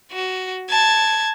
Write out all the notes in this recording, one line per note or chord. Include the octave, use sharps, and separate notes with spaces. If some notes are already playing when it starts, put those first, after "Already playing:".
F#4
A5 G#6